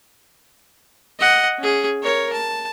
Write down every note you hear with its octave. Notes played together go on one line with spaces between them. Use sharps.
D#5 F#5
C#4 G#4
A#4 C#5
A5